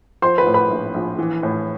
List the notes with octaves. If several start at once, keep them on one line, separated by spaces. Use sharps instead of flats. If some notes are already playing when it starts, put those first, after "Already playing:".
F3 C5 C6
B4 B5
A2
B4 B5
A#1
A#1
E3
A2